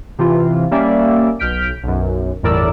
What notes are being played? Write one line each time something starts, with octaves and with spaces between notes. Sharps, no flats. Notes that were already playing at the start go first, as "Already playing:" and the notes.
C3 E3 F4
G3 A#3 C#4 D5 E5
B1 F6 G6 B6 D7
B1 F#2
G1 E2 A2 A#4 D5 E6